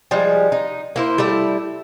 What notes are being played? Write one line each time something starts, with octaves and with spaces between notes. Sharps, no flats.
F3 G3 G#3
D#4
A#3 E4 C5
G3 A3 E4